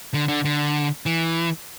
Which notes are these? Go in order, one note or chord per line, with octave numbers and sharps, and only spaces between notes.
D3
D3
D3
E3